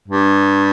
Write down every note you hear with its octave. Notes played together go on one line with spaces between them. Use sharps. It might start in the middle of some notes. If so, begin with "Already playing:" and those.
G2